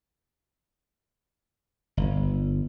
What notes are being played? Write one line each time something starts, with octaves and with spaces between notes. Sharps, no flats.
G1